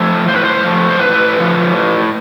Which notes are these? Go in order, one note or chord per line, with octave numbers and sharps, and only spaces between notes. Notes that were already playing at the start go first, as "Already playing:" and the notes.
Already playing: F3 A3
A2 C5
B4
C5
F3 A3
C5
A2 B4
F3 A3
A2